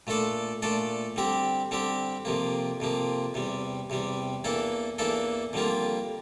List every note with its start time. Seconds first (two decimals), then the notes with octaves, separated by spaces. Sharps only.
0.07 A#2 A3 D4 A4 D5
0.62 A#2 A3 D4 A4 D5
1.16 D3 G3 C4 G4
1.71 D3 G3 C4 G4
2.25 F2 C3 F3 A#3
2.80 F2 C3 F3 A#3
3.34 E2 C3 G3
3.90 E2 C3 G3
4.44 E2 E3 A#3 D4 A4
4.98 E2 E3 A#3 D4 A4
5.53 F2 D3 G3 A#3 F4